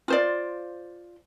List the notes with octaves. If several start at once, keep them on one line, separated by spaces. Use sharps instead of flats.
F4 C5 D5